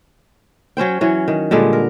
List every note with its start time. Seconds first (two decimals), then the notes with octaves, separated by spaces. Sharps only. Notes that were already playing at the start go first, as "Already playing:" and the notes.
0.77 F#3 C#4 C5 G5
1.01 E3 F#3 C#4
1.28 D#3
1.51 A#2 D3 G3 G#3
1.73 A#4